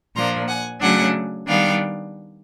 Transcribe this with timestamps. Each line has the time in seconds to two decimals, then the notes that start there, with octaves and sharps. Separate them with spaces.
0.15 A#2 F3 A#3 D4 A#5 C6
0.48 F#5 G#5
0.81 C#3 F#3 A3 D4 F#5 G#5
1.48 D#3 G3 B3 D4 F5 G5